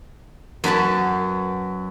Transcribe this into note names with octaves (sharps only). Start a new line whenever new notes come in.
F#2 F#4 B4 A5